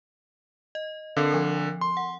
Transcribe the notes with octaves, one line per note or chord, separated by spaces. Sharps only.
D#5
D3 C4 A4 A#4
F3
C6
F#5